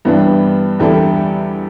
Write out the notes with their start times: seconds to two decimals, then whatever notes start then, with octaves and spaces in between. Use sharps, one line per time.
0.05 G2 E3 G3 B3 D4
0.79 E2 D3 G3 E4 A4